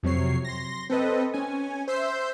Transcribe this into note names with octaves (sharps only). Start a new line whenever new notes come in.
F2 C3 F#3 C#5 C7
C6 A#6
C4 A4 B4 D#5
C#4 G#5
C5 E5 C6 E6 G6 C7